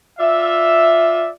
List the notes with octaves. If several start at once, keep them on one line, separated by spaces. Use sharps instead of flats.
F4 D5 E5